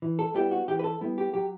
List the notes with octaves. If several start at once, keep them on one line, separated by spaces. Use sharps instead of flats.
E3
A4
G3 B3 E4 G4
F#4
E3 G4
B4
A4
G3 B3 E4
G4
F#3 G4